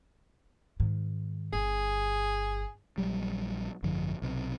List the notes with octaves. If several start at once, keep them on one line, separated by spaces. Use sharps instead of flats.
G#2 D#3
G1 G#4
A#1 F#3 G3
G#1 F#2 D3 F3
B1 C3